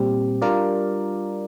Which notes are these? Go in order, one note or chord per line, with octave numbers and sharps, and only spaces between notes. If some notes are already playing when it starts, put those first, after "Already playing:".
Already playing: A#2 G3 C4 G4
G3 D4 F4 A#4 D5